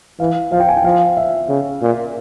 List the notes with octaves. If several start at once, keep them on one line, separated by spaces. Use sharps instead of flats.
E3 F5
F3 F5
G5
G#5
G5
F3 F5
E5
C#3
A#2